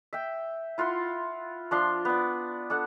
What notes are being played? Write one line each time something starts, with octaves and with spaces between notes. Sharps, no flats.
E5 G5
E4 F4 F#5 C6
F3 D4 C6
B3 D5
D4 A4 F#5